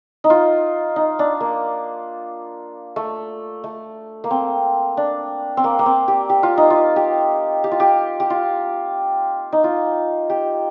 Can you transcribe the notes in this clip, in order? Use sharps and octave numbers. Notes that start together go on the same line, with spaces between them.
D#4
F4
D#4
D4
A#3
A3
A3
A#3
C4
D4
C4
A#3
A#3
C4
G4
G4
F4
D#4
F4
G4
G4
F4
G4
G4
F4
D#4
F4
G4